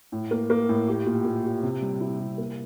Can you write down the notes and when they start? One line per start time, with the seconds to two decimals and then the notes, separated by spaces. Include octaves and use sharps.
0.12 A2
0.31 A#3
0.50 A#3
0.69 A2
0.88 G4
1.06 A#2
1.25 A#2
1.44 G4
1.63 C3
1.82 G3
2.01 E4
2.20 C3
2.38 A#3